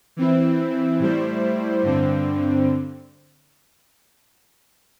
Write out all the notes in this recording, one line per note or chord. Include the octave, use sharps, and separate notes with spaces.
E3 C4 E4
A2 G3 E4 C5
G2 D3 C4